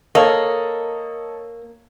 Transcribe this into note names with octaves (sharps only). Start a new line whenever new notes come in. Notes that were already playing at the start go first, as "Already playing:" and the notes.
A#3 A4 C#5 D#5